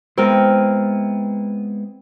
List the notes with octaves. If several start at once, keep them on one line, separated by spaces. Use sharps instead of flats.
G#3 B3 C4 E4 A#4